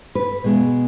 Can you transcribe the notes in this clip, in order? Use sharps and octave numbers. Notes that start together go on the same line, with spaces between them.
B4
B2 G#3 B3